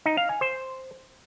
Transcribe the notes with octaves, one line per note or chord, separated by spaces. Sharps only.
D#4
F5
G#5
C5